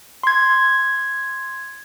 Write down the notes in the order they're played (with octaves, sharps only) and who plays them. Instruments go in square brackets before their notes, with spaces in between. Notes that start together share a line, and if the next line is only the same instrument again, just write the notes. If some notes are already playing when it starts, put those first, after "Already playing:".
[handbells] C6 G#6